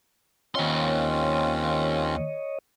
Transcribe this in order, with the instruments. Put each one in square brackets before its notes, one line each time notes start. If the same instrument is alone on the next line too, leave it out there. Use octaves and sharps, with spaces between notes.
[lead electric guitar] D#2 C6 [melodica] C4 C#4 F4 [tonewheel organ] C#5 D#5